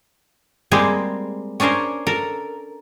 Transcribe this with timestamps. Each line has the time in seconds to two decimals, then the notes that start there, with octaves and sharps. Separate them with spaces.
0.71 G3 G#3 A#3 C4 G4 G#4
1.60 C#4 D4 G#4 A#4 C5
2.07 A4 A#4